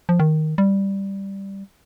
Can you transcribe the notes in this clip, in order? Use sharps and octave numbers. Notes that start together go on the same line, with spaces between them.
F3
D#3
G3